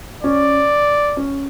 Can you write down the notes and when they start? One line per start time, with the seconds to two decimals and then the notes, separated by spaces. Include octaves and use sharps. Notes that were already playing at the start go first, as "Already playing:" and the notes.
0.24 C#4 D5
1.17 C#4